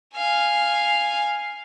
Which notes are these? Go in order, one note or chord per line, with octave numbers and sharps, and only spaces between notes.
F5 G#5